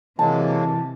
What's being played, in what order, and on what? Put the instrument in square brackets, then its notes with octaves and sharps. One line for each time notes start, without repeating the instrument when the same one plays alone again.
[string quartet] C3 [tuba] E3 [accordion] F#3 G#3 A#3 [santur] A5